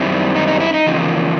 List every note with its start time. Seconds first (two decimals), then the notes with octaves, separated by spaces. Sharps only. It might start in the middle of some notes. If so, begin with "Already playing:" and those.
Already playing: F#2 D#3 G3 C4 E4
0.36 D#4
0.48 D#4
0.60 E4
0.74 D#4
0.87 E2 C#3 F3 A#3